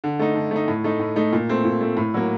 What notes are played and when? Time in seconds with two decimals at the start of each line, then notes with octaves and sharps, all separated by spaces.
0.04 D3
0.19 A3 D#4
0.35 D3
0.51 A3 D#4
0.68 A2
0.84 A3 D#4
1.00 A2
1.16 A3 D#4
1.33 A#2
1.49 A3 C4
1.64 A#2
1.81 A3 C4
1.97 A2
2.14 F#3 A#3